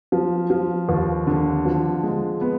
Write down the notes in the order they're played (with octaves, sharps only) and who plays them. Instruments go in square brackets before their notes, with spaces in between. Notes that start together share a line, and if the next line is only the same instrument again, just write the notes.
[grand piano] F3
F3
D#2
D3
F3
G#3
B3